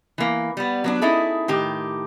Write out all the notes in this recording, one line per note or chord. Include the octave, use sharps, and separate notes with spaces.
E3 A#3
G3 B3
F#3 B3 D4
C#4 D#4 E4 G#4 A4
A2 D#3 G4